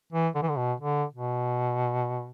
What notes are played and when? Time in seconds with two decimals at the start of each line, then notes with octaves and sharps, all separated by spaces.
0.12 E3
0.35 D3
0.42 E3
0.49 D3
0.57 B2
0.80 D3
1.13 B2